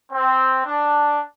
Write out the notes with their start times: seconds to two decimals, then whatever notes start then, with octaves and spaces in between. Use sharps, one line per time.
0.12 C4
0.65 D4